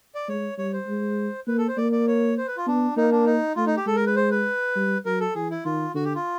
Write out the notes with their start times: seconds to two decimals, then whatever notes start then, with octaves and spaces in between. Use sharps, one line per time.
0.15 D5
0.28 G#3 C#5
0.58 G3 C#5
0.73 C5
0.87 G#3
1.47 A#3 B4
1.58 A4
1.68 C5
1.77 A#3 D5
1.92 D5
2.08 C#5
2.38 C5
2.47 B4
2.57 F4
2.66 B3 D4
2.97 A#3 D#4
3.12 D4
3.26 D#4
3.56 A3 F4
3.66 D#4
3.77 G4
3.86 G#3 A4
3.96 A#4
4.06 B4
4.16 C5
4.31 B4
4.76 G3
5.06 F#3 A#4
5.20 A4
5.35 E3 G#4
5.51 E4
5.65 D#3 F4
5.94 D3 F#4
6.04 G4
6.15 F4